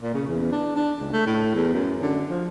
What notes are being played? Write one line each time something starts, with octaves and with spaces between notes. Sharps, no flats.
A#2
C#3
E2
D4
D4
C#2
A3
A2
E2
F#2
D3
F3